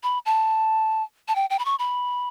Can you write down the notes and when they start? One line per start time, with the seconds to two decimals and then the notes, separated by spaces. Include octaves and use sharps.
0.03 B5
0.26 A5
1.28 A5
1.35 G5
1.50 G5
1.59 B5
1.65 C#6
1.79 B5